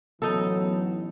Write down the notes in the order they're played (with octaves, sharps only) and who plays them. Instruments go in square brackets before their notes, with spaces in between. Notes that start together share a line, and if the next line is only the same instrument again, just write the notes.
[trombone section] A1 E3 F#3 [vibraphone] B3 [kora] D#4 A4